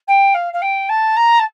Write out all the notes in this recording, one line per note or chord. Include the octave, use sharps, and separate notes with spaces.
G5
F5
F5
G5
A5
A#5
A5